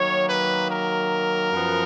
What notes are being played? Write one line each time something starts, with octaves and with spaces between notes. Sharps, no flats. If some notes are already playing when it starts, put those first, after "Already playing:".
Already playing: D#3 F#3 A#3 C#5
B4
A#4
F#2 F3 B3